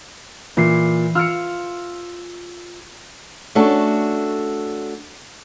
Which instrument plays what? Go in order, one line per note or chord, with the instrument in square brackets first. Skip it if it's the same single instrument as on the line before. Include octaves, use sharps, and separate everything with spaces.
[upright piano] A#2 [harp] E3 C7
[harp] F4 [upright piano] E6 F6 C#7
[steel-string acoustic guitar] A3 C#4 D4 F#4 A4